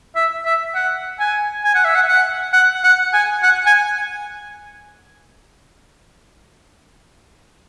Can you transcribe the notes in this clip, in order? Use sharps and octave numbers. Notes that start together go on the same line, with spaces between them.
E5
E5
F#5
G#5
G#5
F#5
E5
F#5
F#5
F#5
F#5
G#5
F#5
G#5